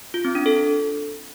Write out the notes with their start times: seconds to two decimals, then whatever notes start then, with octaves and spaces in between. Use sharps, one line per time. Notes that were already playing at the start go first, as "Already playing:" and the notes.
0.14 F4
0.25 C4
0.35 D4
0.46 A4